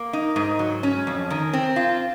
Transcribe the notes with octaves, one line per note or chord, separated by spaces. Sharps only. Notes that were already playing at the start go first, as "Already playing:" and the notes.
Already playing: A#3
D#4
G#2
F#3
C#4
F2
D#3
C4
F4